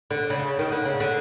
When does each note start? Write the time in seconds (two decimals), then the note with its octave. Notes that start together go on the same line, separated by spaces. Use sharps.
0.11 D3
0.30 C#3
0.59 D#3
0.72 D3
0.85 C#3
1.00 D3